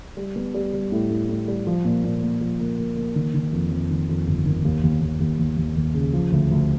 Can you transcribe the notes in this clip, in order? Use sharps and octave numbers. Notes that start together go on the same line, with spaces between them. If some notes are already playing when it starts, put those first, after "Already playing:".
G3
B3
G3
G3
A2
A2
A2
G3
F3
A#2
A#2
A#3
F3
A#3
A#3
A#3
D#3
D#3
F2
F2
D#3
F2
G1
D#3
D#2
D#2
D#2
D#2
D#2
D#2
D#2
C#3
F3
D2
D2